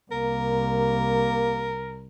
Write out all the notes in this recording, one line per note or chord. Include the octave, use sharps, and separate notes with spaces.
C2 A#3 A#4